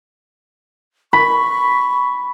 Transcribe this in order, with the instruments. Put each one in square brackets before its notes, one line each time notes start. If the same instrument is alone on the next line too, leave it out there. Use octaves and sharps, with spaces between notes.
[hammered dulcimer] B5 [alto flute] C#6